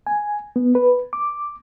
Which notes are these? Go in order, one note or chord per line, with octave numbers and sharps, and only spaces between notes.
G#5
B3
B4
D6